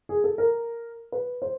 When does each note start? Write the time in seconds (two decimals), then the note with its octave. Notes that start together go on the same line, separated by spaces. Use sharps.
0.09 G#4
0.24 A4
0.38 A#4
1.12 B4
1.42 C5